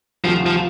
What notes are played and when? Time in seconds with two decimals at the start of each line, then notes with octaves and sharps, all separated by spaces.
0.24 D2 C3 D#3 F3 A3
0.46 F3